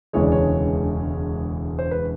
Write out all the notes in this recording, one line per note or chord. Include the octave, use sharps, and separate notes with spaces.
E1 D2 C#3 E3 G#3 C#5
D5
C#5
C5
B4